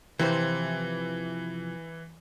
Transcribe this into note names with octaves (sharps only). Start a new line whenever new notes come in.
C3 E3 F3 C5